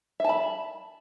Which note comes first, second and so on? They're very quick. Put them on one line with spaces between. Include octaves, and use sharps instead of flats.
E5 A5 B5